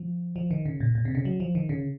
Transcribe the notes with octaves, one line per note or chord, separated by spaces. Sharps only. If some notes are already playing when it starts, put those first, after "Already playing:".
Already playing: F3
F3
D#3
C#3
A#2
A#2
C3
C#3
F#3
F3
D#3
C#3